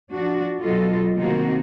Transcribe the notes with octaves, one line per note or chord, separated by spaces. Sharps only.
F3 D4 F#4
B2 F#3 F4 F#4 A4 D#5
C3 D#3 A#3 C4 D#4 F#4